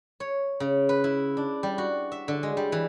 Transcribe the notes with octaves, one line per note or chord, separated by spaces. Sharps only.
C#5
C#3
B4
E4
D4
G3
F#4
E5
D3
G#3
G3
E3